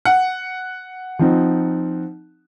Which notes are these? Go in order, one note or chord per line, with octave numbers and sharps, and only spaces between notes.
F#5
F3 C4 D#4